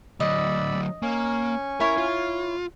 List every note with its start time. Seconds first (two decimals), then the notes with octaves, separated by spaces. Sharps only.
0.20 D2 F#3 D5 D#5 B5 E6
1.02 A#3 C#4 G#5 C#6
1.80 E4 A#4 C#5
1.97 F4